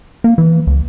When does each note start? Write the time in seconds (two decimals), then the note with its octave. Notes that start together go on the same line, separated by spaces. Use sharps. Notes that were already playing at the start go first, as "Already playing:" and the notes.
0.24 A#3
0.38 E3
0.67 C#2